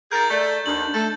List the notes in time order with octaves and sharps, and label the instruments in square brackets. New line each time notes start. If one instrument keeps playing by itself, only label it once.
[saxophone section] D#3 G#4 A#4 [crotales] G6 A6
[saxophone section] A3 [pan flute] D5
[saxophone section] D#2 [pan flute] D4 [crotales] F#7
[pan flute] A3 [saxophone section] A4